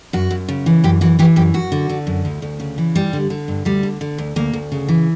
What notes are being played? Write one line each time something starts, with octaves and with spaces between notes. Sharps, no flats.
F#2 F#4
F#2
C#3
E3
F#2 G4
E3 F#4
E3 G4
F#2 G4
F#2 F#4
D3
D3
F#2
D2
D2
C#3
E3
G2 G3
D3
D3
G2
D2 G3
D3
D3
D2
D2 A#3
D2
C#3
E3